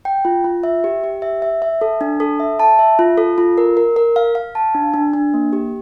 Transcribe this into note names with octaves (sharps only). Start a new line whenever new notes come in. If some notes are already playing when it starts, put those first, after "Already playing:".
G5
F4
F4
E5
G4
G4
E5
E5
E5
A4
D4
A4
E5
A5
E5
F4
A4
F4
A#4
A#4
A#4
F5
F5
A5
D4
D4
D4
A#3
G4